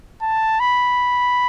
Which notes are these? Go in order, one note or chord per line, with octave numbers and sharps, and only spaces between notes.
A5
B5